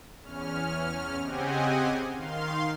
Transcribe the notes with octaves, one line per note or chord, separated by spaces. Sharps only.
E2 C#4 F6
C#3 C4 G4 D#5 F#5 G#5
D#3 F5 C6